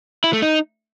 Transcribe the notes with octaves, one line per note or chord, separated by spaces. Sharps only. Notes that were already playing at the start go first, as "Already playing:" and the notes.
E4
A3
D#4